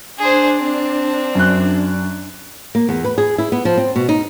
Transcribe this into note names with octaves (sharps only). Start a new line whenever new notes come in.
D4 G#4 C5
C4
F#2 F#6
A#3
E2
B4
G#4
E4
B3
F3
C4
B2
D#4